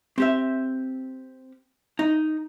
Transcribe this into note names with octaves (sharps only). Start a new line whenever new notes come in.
C4 G4 E5
D#4